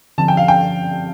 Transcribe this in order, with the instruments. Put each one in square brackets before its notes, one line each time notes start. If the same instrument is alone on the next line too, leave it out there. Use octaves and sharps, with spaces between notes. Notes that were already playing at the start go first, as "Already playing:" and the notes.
[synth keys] D3 F3 C4 [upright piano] A5
[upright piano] G5
F5
G5